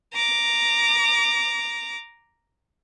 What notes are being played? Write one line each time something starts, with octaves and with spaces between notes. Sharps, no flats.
A#5 D6